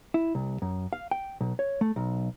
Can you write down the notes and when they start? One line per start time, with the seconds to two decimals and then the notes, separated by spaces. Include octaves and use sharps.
0.14 E4
0.35 C2
0.62 F#2
0.93 F5
1.11 G5
1.41 B1
1.59 C#5
1.81 A3
1.96 B1